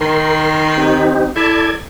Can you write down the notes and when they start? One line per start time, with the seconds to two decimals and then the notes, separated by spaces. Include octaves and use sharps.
0.01 D#3 A#4 C6
0.78 C4 D#4 G4
1.36 E4 A4 D5 G#6